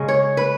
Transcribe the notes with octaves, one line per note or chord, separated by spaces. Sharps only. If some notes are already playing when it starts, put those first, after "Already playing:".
Already playing: C#3 G#3 C#4
C#5
B4